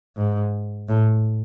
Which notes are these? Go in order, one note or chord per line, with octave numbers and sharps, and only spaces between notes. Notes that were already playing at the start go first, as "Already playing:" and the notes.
G#2
A2